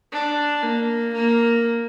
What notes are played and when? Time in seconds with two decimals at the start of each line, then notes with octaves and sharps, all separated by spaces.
0.13 D4
0.63 A#3
1.13 A#3